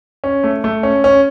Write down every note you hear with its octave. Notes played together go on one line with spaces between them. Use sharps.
C#4
A3
A3
C#4
C#4